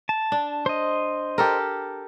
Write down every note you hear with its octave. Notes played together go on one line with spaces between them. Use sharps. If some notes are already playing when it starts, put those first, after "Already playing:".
A5
D4
C5 D#5
G4 A4 A#4